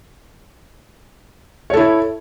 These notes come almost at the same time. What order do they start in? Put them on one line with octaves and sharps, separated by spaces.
C#5 A4 E4